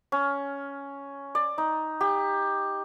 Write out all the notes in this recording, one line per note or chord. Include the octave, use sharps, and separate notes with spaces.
C#4
D5
D#4
G4